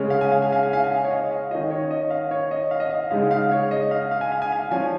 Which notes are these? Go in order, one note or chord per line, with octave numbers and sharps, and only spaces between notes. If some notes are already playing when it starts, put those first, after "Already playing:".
Already playing: C#3 G#3 C#4
F5
G#5
F5
G#5
F5
G#5
F5
G#5
F5
C#5
D#5
F5
D#3 C#4 F4 D#5
C#5
D#5
F5
C#5
D#5
F5
D#5
F5
C#3 G#3 D#4 F5
F5
C#5
D#5
F5
F5
G#5
F5
G#5
F5
F3 C#4 F4 G#5